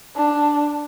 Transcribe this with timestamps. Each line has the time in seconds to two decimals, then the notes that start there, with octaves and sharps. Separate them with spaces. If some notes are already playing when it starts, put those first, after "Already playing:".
0.17 D4